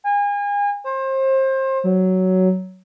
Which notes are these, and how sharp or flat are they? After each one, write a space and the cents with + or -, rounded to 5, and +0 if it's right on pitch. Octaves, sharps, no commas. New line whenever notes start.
G#5 -35
C5 +30
F#3 +10